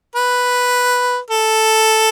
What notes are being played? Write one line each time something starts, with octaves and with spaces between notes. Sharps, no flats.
B4
A4